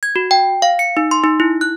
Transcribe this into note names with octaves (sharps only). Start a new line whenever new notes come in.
G#6
F#4
G5
F5
C#7
D#4
C6
D#4
E4
F#6